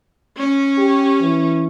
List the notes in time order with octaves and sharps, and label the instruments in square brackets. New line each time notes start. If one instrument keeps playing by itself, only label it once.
[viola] C#4
[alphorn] G4
E3